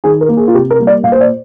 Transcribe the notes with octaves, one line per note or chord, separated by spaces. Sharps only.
D#3 G#4
A#4
A#3
G#4
F4
C3 G4
A#4
G3 A#3
D5
A#2 F5
C5
D5